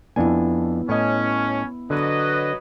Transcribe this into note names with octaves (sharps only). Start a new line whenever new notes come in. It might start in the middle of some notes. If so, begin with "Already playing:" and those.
F2 B3 D4 E4 G#5
A2 C#4 D#5
D3 F#3 B4 D#5